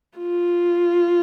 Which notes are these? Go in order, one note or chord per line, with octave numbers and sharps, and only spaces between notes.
F4